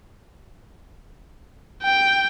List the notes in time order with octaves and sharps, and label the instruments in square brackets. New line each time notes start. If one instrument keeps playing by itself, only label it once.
[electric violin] G5